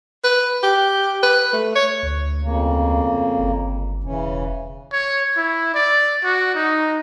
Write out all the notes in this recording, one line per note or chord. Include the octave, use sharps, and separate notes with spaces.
B4
G4
B4
A3
C#5
D2
F2 C#3 A#3
G1
E1 C#3 E3 C#4
C#5
E4
D5
F#4
D#4